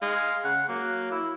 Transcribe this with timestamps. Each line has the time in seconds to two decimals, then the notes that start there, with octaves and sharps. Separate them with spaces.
0.02 G#3 F5
0.44 C#3 F#5
0.69 F#3 A#3
1.11 E4